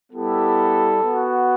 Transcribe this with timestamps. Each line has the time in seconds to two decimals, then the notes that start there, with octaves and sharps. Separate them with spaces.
0.12 G3 B3 E4 G4 A4
1.02 B3 F#4